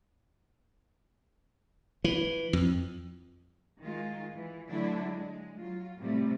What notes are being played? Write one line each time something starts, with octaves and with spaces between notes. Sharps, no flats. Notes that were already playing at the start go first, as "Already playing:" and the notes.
E3
F2
D#3 G#3 F4
E3
D3 F#3 A3 D4 E4
G#3
F#3 F4
A2 C3 G3 A3